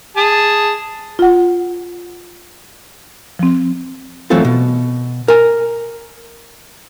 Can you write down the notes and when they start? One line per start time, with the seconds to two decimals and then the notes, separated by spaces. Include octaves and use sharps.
0.17 G#4 A5
1.19 F4 F#5
3.39 F3 C4
4.30 E3 F#3 A3 C4 F4 A4
4.45 B2
5.28 A#4 G#5